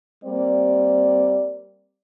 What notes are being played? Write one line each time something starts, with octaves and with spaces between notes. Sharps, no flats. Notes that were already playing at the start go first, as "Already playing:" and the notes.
G3 A#3 C4 D5